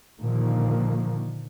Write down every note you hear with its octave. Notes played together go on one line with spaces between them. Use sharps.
A#2 D3 D#3 F3 A#3